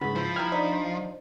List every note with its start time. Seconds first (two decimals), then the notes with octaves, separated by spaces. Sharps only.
0.01 G#2 C#3 A3 B3 B5
0.16 F3 E4 C5
0.36 G3 A#3 E4 F6 G#6
0.52 D4 D#4 C5